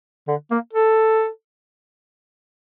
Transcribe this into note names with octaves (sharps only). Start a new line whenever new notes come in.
D3
A#3
A4